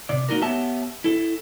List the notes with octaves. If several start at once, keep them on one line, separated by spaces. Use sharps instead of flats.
C3 D5
A#3 D#4 F#4 A#4
B3 G4 C#5 E5 F#5 A5
E4 A4